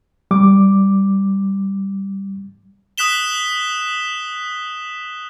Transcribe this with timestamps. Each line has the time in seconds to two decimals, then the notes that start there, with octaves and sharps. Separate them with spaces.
0.31 G3 D6
2.98 D#6 F#6 B6 E7 G7